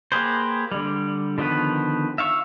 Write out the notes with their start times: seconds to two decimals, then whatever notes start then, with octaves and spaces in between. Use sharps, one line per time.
0.12 A#3 G4 G#4 B4 C5
0.72 D3 G3
1.38 D3 D#3 F3 B3 B4
2.18 E5 F5 C#6 E6